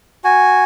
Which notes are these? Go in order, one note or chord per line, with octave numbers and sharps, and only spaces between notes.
F#4 G#5